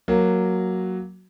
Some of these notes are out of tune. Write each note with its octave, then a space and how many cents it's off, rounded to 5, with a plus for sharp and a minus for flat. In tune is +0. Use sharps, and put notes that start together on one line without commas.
F#3 +0 A#3 +0 F#4 +0